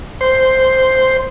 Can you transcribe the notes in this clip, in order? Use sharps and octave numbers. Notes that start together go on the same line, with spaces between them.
C5